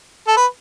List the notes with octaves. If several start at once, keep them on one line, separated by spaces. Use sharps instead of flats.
A4
B4